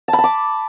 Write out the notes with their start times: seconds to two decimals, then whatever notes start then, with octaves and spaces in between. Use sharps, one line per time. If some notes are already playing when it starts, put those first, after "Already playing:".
0.08 A5
0.13 B5
0.18 A5
0.24 D6